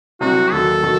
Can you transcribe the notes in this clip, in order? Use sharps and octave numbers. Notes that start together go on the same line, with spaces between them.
C2 C3 F#3 C4 F#4
D#2 D#3 F#3 A4
D#3 F#3